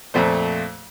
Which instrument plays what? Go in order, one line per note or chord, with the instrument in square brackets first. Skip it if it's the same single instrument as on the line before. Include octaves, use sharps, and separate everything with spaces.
[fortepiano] F2 A#2 A3 C5